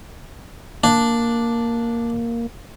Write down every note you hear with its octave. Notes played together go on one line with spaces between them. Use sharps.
A#3 D4